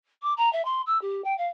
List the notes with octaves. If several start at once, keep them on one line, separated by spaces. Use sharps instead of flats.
D6
A#5
E5
C6
E6
G4
G5
F5